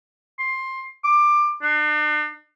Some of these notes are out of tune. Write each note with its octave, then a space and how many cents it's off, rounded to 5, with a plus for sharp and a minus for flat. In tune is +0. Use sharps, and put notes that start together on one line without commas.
C6 +15
D6 +20
D4 +40